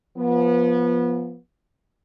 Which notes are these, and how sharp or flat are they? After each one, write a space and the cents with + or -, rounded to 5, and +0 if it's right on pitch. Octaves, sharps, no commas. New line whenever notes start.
F3 +0 B3 -25